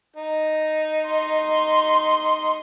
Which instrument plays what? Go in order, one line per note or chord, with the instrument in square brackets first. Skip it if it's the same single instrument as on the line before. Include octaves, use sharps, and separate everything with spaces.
[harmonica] D#4
[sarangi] C6